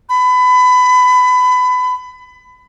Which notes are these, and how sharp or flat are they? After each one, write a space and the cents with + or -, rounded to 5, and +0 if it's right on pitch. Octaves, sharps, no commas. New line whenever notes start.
B5 +25